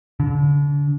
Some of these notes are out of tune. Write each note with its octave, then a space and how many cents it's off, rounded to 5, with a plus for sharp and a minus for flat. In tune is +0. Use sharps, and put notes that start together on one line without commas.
D3 -35